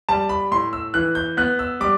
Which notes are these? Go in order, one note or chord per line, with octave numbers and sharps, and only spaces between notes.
G3 A5
B5
A2 C6
E6
E3 F#6
G6
B3 F#6
E6
G3 D6